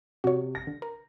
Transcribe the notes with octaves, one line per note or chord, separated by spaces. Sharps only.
C3 F#4 C#5
A#6
D3
A#4